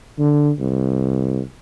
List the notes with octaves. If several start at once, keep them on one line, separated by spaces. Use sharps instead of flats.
D3
C2